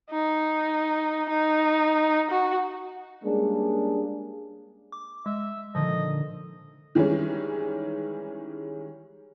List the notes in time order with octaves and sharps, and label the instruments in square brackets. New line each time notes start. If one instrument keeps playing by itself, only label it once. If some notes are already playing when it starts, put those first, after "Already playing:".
[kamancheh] D#4
D#4
F#4
[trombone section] G3 G#3 A#3 C#4 D4 G#4
[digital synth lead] D6
[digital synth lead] G#3 [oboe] E5
[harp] A#2 D3 D#3 [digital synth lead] F3 [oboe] D#5
[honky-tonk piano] D#3 E3 G3 G#3 C#4